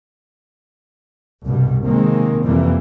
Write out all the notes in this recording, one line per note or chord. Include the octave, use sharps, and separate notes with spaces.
C2 G2 B2 G3
C3 D#3 G#3 A#3 C4
F2 C3 E3 G3 A#3